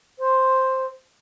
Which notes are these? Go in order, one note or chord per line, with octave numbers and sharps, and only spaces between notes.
C5